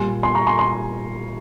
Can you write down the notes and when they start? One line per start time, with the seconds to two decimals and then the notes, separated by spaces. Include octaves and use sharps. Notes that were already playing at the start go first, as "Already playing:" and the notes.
Already playing: A#2 G3 G#5 C6
0.23 G#5 C6
0.35 A#5 C#6
0.47 G#5 C6
0.59 G#5 C6